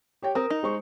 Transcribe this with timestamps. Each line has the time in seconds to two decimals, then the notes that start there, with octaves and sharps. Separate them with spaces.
0.22 G4 C#5 G5
0.35 C4 A#4 A#5 D#6
0.50 D#4
0.63 G#3 C5 C#6